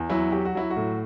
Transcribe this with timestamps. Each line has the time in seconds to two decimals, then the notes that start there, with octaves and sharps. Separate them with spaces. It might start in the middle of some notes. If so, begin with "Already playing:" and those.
Already playing: E2
0.10 F#3 E4
0.32 F#3 G4
0.45 F#4
0.55 F#3 E4
0.70 F#4
0.76 A2